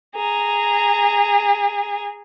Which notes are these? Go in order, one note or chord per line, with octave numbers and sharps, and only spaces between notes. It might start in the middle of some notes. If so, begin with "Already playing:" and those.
G#4 A#5